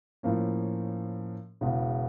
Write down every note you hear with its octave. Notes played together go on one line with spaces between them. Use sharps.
A2 F3 A#3 C#4
E1 E2 C#3